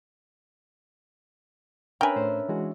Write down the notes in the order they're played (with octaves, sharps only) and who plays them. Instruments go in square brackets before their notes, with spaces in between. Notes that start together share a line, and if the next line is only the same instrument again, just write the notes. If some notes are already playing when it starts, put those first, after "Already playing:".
[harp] C#4 D4 E5 [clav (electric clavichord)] A#4 B4 [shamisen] G5 G#5
[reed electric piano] A2 A3 C5
E3 G#3 F#4